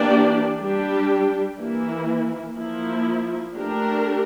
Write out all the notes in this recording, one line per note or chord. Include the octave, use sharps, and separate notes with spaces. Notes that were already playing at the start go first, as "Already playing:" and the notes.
Already playing: E3 A#3 D4 G4 D5
G3 D4 G4
E3 A#3 E4
F3 A#3 E4
A3 D4 G4 A#4